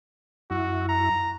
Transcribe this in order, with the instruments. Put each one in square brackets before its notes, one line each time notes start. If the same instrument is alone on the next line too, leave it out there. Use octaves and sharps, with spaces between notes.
[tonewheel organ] F#2 E4 [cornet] F#4
[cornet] A#5